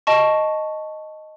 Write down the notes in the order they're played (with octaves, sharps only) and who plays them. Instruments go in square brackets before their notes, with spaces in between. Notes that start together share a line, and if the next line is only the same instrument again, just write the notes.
[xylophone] D#5 A5 C#6